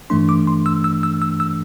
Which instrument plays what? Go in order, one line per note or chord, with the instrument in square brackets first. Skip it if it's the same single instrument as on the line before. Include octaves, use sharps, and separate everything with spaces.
[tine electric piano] G2 E3 A3 D4 C6
D6
C6
E6
E6
E6
E6
E6